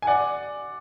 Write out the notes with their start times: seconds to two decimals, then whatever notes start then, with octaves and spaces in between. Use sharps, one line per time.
0.02 G#5
0.07 D5 F#5